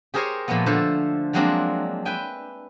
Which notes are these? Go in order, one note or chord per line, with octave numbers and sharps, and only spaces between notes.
G4 G#4 A#4 C5 C#5 G#5
A#2 F3 G#3 A3 B3
D3 F3 A4 C5
F3 F#3 G#3 A#3 C4 D4
B4 E5 G5 G#5